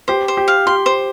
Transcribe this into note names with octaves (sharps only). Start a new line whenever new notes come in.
G4 C5
C5
G4
F5
G4 C6
C5